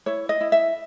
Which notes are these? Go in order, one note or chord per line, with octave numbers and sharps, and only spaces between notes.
E4 C#5
D#5
E4
E5